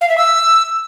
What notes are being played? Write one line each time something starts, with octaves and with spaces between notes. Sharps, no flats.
F5
E5
E6